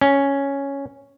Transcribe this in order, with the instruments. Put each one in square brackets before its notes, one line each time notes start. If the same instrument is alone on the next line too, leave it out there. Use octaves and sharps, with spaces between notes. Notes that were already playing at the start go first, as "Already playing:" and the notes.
[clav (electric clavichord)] C#4